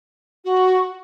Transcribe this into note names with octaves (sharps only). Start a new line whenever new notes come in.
F#4